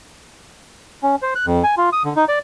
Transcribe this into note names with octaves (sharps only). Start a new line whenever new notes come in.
C#4
C5
F#6
F2
G#5
F4
D#6
D3
D#4
D5